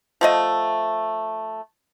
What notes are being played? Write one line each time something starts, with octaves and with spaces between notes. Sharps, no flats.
F3 A3 D#5